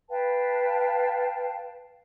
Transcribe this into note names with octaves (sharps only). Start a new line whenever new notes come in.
B4 F5 G5 A5